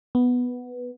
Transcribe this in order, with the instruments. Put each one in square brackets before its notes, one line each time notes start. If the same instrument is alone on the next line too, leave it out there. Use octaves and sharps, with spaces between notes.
[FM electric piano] B3